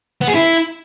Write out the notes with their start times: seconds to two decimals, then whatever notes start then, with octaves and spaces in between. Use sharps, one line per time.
0.22 B3
0.28 G#4
0.35 E4